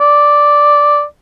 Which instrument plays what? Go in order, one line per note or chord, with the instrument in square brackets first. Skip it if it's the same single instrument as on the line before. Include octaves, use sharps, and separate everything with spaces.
[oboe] D5